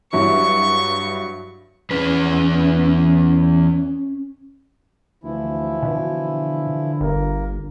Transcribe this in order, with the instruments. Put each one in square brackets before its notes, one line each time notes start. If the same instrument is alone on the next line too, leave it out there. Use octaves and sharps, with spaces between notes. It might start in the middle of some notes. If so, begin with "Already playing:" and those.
[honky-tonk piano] G2 F#3 E4 [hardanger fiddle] C#6
[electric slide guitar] E2 G#4 B4 [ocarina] C#4
[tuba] D2 [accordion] E3 F3 E4
[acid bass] B2 [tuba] D3
[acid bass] G1 [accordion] A#3 A#4